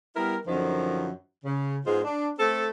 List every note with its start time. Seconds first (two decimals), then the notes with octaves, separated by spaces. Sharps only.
0.16 G3 B3 E4 A#4
0.47 F#2 D3 D#3 F3
1.45 C#3
1.86 G#2 G#3 B3 F4 C5
2.04 D4
2.39 A3 C4 A4